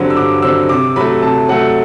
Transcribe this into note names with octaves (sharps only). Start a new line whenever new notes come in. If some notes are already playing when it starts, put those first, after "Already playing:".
Already playing: G2 D3 F#3 C4
E6
G2 D6
D3 F#3 C4 E6
C3 D6
F#3 A3 B5
C3 A5
F#3 A3 F#5